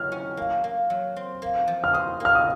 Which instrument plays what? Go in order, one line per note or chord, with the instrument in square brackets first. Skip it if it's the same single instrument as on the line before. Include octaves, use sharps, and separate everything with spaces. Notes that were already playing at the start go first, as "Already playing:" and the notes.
Already playing: [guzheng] F#3 [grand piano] F6
[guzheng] C#4
A#3
A#3
F#3
C4
A#3
F3
[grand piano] F6
[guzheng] C5 [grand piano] D#6
[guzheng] A#3 [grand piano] F6
[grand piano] D#6